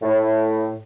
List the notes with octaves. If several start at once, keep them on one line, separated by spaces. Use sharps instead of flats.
A2